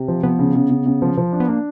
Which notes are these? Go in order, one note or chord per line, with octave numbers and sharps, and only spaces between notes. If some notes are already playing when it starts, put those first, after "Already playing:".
Already playing: C3
F3
F3 B3
C#3
C#3
C#3
C#3
F3
F3
D4
B3
A#3 D4